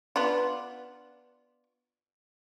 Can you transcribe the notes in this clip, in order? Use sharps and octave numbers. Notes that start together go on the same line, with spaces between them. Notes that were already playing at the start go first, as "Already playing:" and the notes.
B3 D4 F4